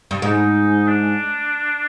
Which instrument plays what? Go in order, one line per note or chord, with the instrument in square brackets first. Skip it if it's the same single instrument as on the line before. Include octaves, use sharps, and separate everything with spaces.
[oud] G2
[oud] G#2 [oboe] D#4
[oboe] D4